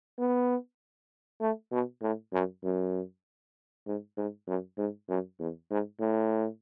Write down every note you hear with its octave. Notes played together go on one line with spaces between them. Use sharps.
B3
A3
B2
A2
F#2
F#2
G#2
G#2
F#2
G#2
F#2
E2
G#2
A2